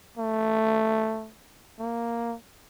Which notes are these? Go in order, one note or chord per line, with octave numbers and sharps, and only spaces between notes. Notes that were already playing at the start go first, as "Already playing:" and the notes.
A3
A#3